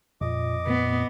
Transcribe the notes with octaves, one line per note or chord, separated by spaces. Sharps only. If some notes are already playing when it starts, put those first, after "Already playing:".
F2 A#2 D#5 D6
A#2 B3